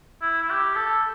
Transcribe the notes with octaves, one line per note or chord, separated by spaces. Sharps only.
E4
E4
G4
A4